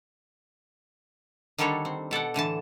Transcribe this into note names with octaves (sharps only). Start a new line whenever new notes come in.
D3 D#3 G3 D4 A4 C#5
C4
B2 A4 D5 F#5
A2 D3 E3 A5